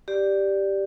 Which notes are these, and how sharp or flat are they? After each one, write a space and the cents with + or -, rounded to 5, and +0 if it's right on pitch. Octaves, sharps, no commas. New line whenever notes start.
G4 +0 D5 +0